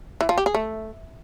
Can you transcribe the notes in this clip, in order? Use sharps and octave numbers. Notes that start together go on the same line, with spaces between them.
E3
F3
G4
G#4
A3